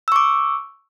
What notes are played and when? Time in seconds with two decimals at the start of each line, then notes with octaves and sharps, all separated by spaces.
0.08 E6
0.12 C#6
0.16 D6